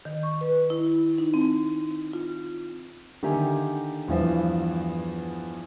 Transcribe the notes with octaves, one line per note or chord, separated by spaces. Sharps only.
D#3
C#6
B4
E4
D#4
C4
F4
D3 D#3 A#3 G4 E5 G#5
E2 G2 E3 F3